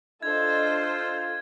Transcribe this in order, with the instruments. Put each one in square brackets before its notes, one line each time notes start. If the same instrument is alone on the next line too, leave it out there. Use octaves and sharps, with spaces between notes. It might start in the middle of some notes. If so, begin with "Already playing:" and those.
[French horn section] D4 D#5 [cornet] F4 [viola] A4 C5 [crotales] G#6